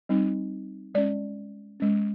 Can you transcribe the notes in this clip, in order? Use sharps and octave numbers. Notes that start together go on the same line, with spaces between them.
G3 C4 D#4
G#3 C#4 D5
G#3 C#4